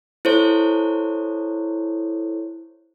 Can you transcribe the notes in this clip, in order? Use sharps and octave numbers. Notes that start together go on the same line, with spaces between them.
E4 A4 C5 C#5